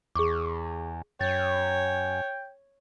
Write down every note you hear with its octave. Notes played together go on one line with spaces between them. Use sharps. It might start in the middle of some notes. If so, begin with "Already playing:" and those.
E2 G#4 C#6 D6
F#2 C#5 G5 A6